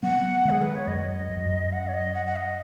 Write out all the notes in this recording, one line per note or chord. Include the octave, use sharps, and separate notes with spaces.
F#3 B3 F#5
D#3 G#3 G#4
B4
C#5
F#2 D#5
F#2
F#2
F#5
C#5
D#5
F#5
F#5
D#5